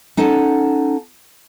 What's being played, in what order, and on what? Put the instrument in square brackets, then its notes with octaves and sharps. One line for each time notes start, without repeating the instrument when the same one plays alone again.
[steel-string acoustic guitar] C#4 D#4 A4 F#5 A5